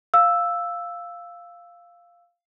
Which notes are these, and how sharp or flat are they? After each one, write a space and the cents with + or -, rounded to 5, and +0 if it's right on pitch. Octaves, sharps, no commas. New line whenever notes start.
F5 +0 E6 +0